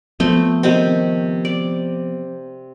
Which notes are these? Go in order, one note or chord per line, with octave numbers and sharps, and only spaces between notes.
F3 A3 B3 C4
C3 D#3 C4
D5